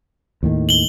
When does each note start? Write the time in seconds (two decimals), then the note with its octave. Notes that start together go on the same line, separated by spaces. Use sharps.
0.43 D#2 A2 D#3
0.69 F#7 G7